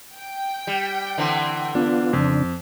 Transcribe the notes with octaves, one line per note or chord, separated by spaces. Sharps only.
G5
G3
D3 E3 C4
B3 D4 F4
F2 C#3 D4